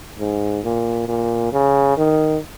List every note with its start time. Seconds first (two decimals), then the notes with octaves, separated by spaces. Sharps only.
0.19 G#2
0.64 A#2
1.08 A#2
1.53 C#3
1.97 D#3